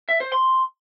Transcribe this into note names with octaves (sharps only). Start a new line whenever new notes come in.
E5
C5
C6